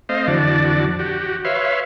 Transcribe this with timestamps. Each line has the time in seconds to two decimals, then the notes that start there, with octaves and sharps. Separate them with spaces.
0.09 A3 C4 C5 D#5 F5
0.27 F2 D3 E3 F#4 D5 A5
0.99 F#4 G4
1.45 B4 C#5 E5 F5 C6